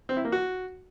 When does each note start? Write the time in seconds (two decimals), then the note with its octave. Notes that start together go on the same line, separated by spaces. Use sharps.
0.09 C4
0.17 E4
0.25 A#3
0.32 F#4